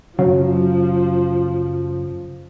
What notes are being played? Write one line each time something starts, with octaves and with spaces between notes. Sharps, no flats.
F#2 A2 C#3 F3 F#3